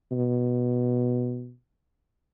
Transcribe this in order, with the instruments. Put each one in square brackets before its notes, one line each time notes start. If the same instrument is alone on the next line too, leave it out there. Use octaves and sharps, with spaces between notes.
[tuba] B2